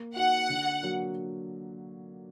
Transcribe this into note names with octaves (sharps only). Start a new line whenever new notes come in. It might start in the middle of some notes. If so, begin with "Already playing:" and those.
Already playing: A#3
D#4 F#4 F#5
D3
F#3 A#3 D4 F#4